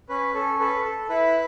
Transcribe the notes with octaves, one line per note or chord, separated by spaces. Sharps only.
C#4 B4
C#4 A4
A4 B4
A4
E4 B4